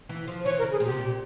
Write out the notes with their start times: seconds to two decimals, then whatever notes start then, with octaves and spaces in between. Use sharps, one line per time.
0.09 E3
0.27 F3
0.45 E3 C#5
0.58 A#4
0.62 C#3
0.72 G#4
0.80 A#2
0.85 G4
0.90 C3
0.99 A#2